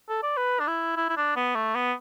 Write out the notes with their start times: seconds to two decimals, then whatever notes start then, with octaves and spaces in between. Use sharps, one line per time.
0.09 A4
0.23 D5
0.38 B4
0.60 D4
0.68 E4
0.97 E4
1.09 E4
1.17 D4
1.36 B3
1.55 A3
1.76 B3